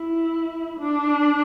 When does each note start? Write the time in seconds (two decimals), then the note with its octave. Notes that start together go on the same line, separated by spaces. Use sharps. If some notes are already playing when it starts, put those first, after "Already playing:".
Already playing: E4
0.80 D4